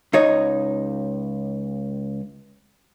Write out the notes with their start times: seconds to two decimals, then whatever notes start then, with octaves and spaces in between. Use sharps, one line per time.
0.13 C#2 D#4 C#5 D#5